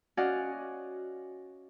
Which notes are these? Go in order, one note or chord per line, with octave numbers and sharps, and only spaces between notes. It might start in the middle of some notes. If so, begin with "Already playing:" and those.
C#4 F#4 D5 D#5 F5 F#5